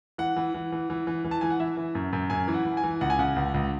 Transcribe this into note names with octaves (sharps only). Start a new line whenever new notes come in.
E3 F#5
E3
E3
E3
E3
E3
E3
A5
E3 G#5
F#5
E3 E5
E3
F#2
F#2
F#2 G#5
E3
F#5
E3
G#5
E3
C#2 F#5
G#5
C#3 F#5
C#2
C#2